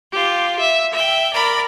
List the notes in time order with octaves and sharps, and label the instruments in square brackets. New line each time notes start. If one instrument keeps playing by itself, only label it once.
[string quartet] F4 G4
E5
E5 G5
A#4 D5 A#5 B5